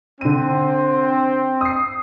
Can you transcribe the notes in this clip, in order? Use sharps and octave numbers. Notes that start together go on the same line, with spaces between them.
D3 C4 D#7
D#6 C7